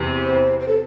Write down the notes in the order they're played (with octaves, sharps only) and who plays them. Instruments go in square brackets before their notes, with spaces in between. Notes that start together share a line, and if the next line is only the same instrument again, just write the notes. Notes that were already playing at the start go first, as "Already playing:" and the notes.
Already playing: [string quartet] E2 C3 E3 C4
[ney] C5
C5
A4